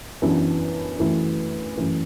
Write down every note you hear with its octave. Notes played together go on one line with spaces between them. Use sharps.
F#2 E3 B3 D4
F#2 E3 A3 E4
F#2 E3 A3